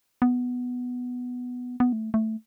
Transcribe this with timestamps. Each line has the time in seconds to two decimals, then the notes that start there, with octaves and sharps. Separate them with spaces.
0.22 B3
1.80 B3
1.93 A3
2.14 A3